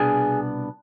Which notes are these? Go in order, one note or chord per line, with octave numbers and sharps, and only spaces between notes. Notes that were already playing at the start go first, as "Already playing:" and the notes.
Already playing: C2 B2 B3 D4 G#4 G#5